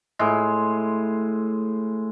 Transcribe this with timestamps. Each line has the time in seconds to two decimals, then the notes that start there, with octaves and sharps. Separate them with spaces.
0.19 A2 G#3